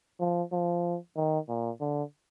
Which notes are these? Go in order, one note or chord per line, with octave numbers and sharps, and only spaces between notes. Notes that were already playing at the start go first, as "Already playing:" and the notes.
F3
F3
D#3
A#2
D3